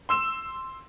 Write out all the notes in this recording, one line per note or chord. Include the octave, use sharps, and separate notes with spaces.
C6 E6 E7